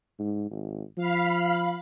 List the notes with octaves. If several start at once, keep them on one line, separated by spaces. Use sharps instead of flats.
G#2
G#1
F3 F5 B5